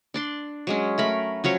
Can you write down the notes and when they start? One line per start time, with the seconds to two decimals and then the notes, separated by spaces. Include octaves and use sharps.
0.14 D4 D5 C6
0.67 F#3 G#3 C#4
0.98 A3 A#4 B5
1.44 F3 F#3 C#4 C#5